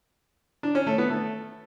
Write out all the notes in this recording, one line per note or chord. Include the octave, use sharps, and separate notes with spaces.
D4
C#4
A3
B3
A3